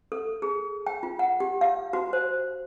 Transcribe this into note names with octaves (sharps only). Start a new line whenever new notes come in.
A4
G#4
G5
F4
F#5
G4
F5
F#4
C5